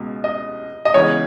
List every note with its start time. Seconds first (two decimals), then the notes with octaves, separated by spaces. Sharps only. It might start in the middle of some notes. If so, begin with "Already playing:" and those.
Already playing: C#2 B2 G#3
0.24 D#5
0.85 D#5
0.94 C#2 C#3 E3 B3 C#5